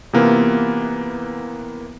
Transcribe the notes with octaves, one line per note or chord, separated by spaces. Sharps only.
C3 E3 A#3 B3 F4